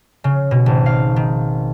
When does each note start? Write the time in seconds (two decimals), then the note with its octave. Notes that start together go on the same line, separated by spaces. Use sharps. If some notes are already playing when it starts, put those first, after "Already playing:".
0.24 C#3
0.51 B2
0.66 G#1
0.86 F5
1.16 D#3